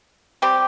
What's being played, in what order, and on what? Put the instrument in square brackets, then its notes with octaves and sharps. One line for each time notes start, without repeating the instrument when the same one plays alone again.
[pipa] G3 C4 G4